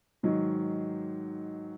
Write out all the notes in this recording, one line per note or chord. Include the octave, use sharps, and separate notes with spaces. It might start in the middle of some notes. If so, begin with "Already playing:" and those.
G#2 D#3 F#3